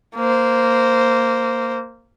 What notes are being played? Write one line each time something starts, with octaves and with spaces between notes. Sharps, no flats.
A#3 C5